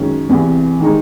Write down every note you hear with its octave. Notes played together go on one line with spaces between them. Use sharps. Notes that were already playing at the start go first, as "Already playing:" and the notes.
Already playing: F#2 D#3 G#3 C#4
E2 C3 E3
D#3 G#3 D#4